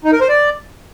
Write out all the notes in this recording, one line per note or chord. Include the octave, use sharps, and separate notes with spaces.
D#4
A#4
C5
D5